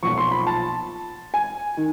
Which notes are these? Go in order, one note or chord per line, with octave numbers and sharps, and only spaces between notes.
B1 A#2 F3 C#6
C6
B5
A5
G#5
D#3